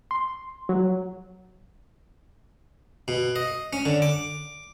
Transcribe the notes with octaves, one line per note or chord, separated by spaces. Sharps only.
C6
F#3
B2
D#5
C#4
D3
D6